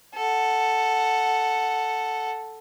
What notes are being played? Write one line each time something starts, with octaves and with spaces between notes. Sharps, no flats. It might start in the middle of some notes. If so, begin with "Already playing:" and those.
A4 F#5